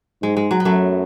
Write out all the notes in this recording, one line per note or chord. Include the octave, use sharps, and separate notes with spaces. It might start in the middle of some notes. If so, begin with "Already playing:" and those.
G#2 G#3
G#3
F#3
B3
F#2 F#3 A3